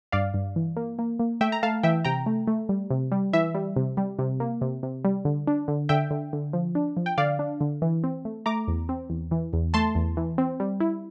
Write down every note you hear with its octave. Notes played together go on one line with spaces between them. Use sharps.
G2 D5 F5
G2
E3
A#3
A#3
A#3
A3 E5 G5
A#5
A3 F5 A5
E3 E5 G5
C3 G5 A#5
A3
A3
G3
C3
G3
E3 E5
G3
C3
G3
C3
A#3
C3
C3
G3
D3
D4
D3
D3 E5 G5
D3
D3
F3
D4
F3
G5
D3 D5 F5
D4
D3
E3
C4
A3
A3 A#5 D6
E2
C4
E2
E3
E2
A3 A5 C6
E2
E3
C4
G3
E4